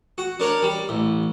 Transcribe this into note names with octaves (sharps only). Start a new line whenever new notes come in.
F#4
D4 A#4 C#5
G3
A1